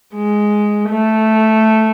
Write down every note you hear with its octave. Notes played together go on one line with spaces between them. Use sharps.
G#3
A3